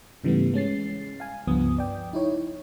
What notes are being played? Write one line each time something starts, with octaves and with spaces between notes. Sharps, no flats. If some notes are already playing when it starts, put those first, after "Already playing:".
G#2 C#3 E3 G3 A3 B3
G#3 C#4 A6 C7
F5 G#5
C#2 G2 F3 B3 D#6
D5 G5
D#4 E4 C#5